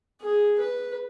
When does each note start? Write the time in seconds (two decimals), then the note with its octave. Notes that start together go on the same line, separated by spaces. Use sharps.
0.21 G#4
0.59 B4